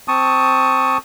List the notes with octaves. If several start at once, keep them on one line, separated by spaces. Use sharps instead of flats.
C4 A5 C#6 D#6